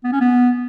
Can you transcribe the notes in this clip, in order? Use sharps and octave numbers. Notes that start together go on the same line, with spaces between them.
B3
C#4
B3